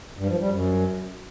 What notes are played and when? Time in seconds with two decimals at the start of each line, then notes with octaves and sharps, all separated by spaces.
0.17 G2
0.28 F3
0.40 G3
0.51 F#2